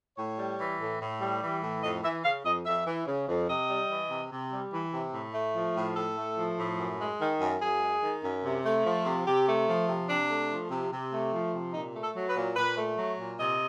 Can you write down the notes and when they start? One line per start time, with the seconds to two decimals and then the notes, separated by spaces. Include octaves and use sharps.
0.17 A2 C#5
0.38 G3
0.59 E3
0.79 A2
1.01 A2
1.21 G3
1.41 E3
1.63 A2
1.82 F2 D#5
2.03 E3 E5
2.24 C#3 F5
2.44 F2 D#5
2.65 F2 E5
2.86 E3
3.06 C#3
3.28 F2
3.48 C3 D#5
3.69 G3
3.89 E3
4.09 C3
4.30 C3
4.51 G3
4.72 E3
4.93 C3
5.12 A2
5.34 A3
5.55 F3
5.75 A2
5.95 A2 A4
6.16 A3
6.37 F3
6.57 A2
6.78 F#2
6.99 G#3
7.20 D#3
7.40 F#2
7.61 F#2 G#4
7.81 G#3
8.03 D#3
8.23 F#2
8.43 C3
8.65 A3
8.85 F3
9.05 C3
9.26 C3 G4
9.47 A3
9.68 F3
9.88 C3
10.09 C3 D4
10.30 A3
10.50 F3
10.71 C3
10.91 C3
11.11 A3
11.33 F3
11.54 C3
11.73 A#2 D#4
11.94 A3
12.02 A4
12.15 F#3
12.29 B4
12.35 A#2
12.56 A#2 B4
12.76 A3
12.98 F#3
13.18 A#2
13.39 C3 D#5